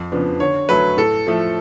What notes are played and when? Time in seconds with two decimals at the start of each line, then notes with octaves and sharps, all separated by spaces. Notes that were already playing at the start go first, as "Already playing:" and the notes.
Already playing: F2
0.12 C#3 F3 B3 D4
0.40 D3 C#5
0.69 F#3 A3 B4
0.97 A2 A4
1.27 F3 A3